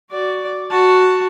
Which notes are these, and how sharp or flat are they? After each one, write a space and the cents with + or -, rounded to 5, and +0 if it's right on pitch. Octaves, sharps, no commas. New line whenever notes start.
F#4 +10 D5 +0
F#4 +0 A5 +10